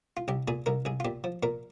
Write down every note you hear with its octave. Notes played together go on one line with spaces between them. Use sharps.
F4
C2 G4
A#2 G#4
C2 A#4
C2 G#4
F4
A#2 G4
F3
A#2 A#4